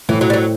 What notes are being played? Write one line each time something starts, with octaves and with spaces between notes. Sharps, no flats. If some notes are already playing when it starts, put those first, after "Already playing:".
A2 E3
F#3
G3
F#3